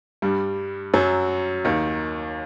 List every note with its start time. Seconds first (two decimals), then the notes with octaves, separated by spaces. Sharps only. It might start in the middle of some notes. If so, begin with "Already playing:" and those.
0.22 G2 G3
0.94 F#2 F#3
1.65 D#2 D#3